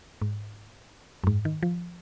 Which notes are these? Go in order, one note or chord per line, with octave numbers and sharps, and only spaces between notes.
G#2
F#2
G#2
D#3
F3